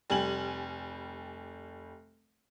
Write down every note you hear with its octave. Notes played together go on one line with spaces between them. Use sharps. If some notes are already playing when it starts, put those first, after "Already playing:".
F1 G3 G#5 F#7